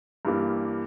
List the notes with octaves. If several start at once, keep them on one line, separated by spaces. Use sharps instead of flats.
G2 E3 G3 A#3